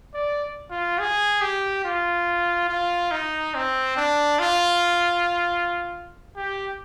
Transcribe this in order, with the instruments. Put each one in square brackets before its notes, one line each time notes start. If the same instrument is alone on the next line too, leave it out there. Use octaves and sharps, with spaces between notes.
[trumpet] D5
F4
G#4
G4
F4
F4
D#4
C4
D4
F4
G4